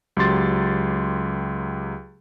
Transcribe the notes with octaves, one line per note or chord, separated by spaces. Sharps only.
C#2 F#3 G4 C6 A6